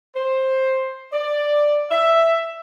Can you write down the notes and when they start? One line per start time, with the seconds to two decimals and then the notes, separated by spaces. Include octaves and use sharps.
0.15 C5
1.12 D5
1.91 E5